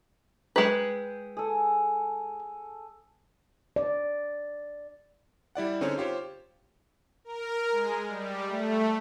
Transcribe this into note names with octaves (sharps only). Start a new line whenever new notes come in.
G#3 B4 G5 D#6 E6
G#4 A4
D5
G3 E4 D5 F#5
D3 C4 C#4 D#4 G#4 C#5
F4 G4 C5 C#5
A#4
G#3
G3
A3